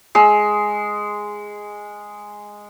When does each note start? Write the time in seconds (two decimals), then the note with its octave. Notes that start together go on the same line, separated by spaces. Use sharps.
0.15 G#3 E6